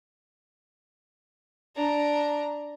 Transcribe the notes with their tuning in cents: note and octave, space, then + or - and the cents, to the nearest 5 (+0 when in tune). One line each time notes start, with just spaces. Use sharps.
D4 +0 A#5 +10